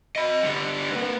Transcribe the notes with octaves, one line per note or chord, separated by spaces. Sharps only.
D#5 B5
D3 G3
A#3 B4